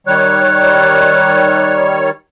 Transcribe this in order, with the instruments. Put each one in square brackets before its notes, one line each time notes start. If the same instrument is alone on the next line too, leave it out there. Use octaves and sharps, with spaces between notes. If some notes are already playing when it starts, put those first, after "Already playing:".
[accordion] D#3 G3 C#5 [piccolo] F#6